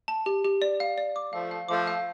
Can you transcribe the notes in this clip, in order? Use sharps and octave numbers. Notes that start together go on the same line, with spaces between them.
A5
G4
G4
D5
F5
D5
D6
F3 A3 F5
F5
F3 A3 D6
F5